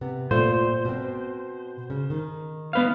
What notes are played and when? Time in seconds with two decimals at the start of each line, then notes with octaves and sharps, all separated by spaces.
0.01 C3 B3
0.31 A#2 A3 F4 C5
0.85 B2 C4
1.90 C#3
2.10 D#3
2.73 B3 B4 F5